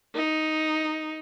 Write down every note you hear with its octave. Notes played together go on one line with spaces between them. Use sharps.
D#4